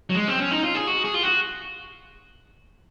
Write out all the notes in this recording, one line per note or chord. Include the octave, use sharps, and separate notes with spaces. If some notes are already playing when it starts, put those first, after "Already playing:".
F#3
G#3
C4
C#4
D#4
F4
G#4
F#4
G#4
F4
F#4